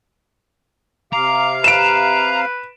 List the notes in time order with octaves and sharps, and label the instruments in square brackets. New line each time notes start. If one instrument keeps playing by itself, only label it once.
[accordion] C3 F5 [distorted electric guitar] A#5 [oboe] D6
[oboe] B4 [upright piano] D7 E7